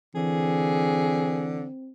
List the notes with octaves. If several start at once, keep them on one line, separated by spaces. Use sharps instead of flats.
D3 E3 C4 G#4